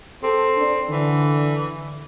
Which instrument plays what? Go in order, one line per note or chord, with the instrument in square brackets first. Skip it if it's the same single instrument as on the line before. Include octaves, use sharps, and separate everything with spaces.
[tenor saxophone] C4 [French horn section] A4
[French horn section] D4 A4
[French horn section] D3 [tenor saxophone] E3